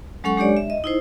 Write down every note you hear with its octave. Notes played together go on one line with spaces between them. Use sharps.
F#3 G#3 C#4 A4 F#5 C#6
G#3 D4 G4 C#5 D5
E5
D#5
D#4 E4 C5